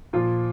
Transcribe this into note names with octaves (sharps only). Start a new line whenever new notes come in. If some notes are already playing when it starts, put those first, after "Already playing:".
A#2 F3 F4